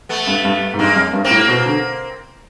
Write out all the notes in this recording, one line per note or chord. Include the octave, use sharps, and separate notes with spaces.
A3 B3
G2
G2
G#2
G2 G#3 A#3
F#2
G2
A#3 C4
A2
B2
D3